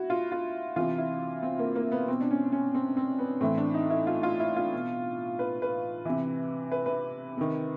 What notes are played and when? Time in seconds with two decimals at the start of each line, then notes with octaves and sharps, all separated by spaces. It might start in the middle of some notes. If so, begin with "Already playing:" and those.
Already playing: E4 F#4
0.10 F4
0.32 F4
0.76 C3 E3 F4
0.98 E4
1.43 C4
1.59 A#3
1.75 A#3
1.92 B3
2.08 B2 C4
2.21 D4
2.31 C#4
2.52 C#4
2.75 C4
2.97 C4
3.19 B3
3.41 A2 E3 C4
3.57 D4
3.74 D#4
3.90 E4
4.07 F4
4.23 F4
4.40 E4
4.56 F4
4.73 B2
5.39 B4
5.62 B4
6.05 C3 E3
6.72 B4
6.86 B4
7.37 C3 D#3